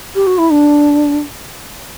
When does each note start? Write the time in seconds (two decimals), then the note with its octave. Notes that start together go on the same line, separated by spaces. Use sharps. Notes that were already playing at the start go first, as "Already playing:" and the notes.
0.15 G4
0.27 F#4
0.38 E4
0.51 D4